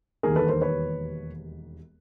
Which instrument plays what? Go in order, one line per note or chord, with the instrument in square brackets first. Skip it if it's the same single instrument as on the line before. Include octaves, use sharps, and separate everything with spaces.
[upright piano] E1 D#2 D#3 G3 A#3 G#4 A#4
A4 B4
A#4 C5
B4 C#5